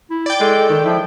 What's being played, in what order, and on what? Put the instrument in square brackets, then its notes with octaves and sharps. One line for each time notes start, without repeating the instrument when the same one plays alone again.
[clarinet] E4
[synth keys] D5 G5
[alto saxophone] G#3 [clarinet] A4
[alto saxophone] D#3
[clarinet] F3 [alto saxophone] E4